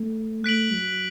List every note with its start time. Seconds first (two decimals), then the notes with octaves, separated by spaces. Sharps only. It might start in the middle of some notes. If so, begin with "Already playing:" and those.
Already playing: A3
0.44 A3 F#6 B6 D7 F#7
0.72 F#3